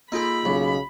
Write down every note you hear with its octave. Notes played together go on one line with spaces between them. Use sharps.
A#3 D#4 F4 G#4 A4 B5
B1 C#3